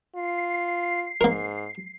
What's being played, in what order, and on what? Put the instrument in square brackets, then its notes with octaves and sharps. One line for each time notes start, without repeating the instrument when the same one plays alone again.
[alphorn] F4 [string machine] C7
[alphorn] G#2 [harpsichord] A#3 A#4